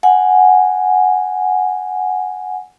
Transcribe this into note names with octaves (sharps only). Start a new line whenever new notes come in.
F#5 G#5